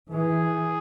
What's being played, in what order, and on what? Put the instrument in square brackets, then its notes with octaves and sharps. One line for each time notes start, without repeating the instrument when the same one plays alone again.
[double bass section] E3 [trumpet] G#4